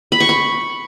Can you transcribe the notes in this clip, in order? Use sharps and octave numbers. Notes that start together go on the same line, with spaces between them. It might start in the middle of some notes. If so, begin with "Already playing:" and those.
B5
C#6
B5